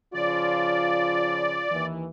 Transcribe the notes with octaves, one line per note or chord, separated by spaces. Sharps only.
C#3 F3 F4 D5
D#2 E3